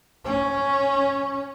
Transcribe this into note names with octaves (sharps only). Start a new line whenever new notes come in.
C#4